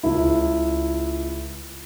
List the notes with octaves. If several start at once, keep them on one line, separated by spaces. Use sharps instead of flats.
C#2 E4